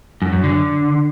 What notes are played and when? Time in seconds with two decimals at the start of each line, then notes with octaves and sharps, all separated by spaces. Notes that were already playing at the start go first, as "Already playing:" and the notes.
0.22 F#2
0.33 F#2
0.44 D3